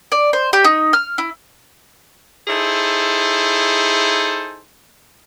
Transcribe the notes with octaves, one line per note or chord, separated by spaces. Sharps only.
D5
C5
G4
D#4
F6
E4
D#4 E4 G#4 A4 C5